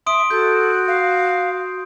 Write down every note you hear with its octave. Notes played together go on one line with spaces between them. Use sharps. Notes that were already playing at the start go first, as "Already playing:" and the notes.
E5 C6 D#6 D7
F#4 A4 G6
F5